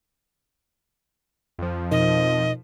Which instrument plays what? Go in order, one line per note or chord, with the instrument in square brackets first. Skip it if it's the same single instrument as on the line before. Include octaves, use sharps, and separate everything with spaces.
[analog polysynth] F2 F3
[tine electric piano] B2 D#4 A#4 [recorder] D#5